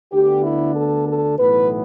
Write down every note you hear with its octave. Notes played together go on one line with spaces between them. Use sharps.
D2 D3 B3 D4 G4
E4
A4
A4
B1 A2 E3 B3 B4